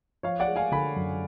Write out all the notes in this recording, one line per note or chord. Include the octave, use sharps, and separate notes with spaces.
F3 C#5 F5
D5 F#5
G#3
F5 G#5
D3 G#5 B5
F#2